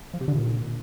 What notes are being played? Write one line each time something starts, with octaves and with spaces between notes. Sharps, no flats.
F3
C3
D3
A#2